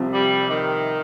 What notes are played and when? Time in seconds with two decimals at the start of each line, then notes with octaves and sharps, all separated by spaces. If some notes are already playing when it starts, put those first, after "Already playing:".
Already playing: C2 C3 F3
0.12 G3
0.48 D#3